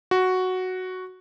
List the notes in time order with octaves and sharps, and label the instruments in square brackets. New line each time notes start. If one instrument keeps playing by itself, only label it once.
[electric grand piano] F#4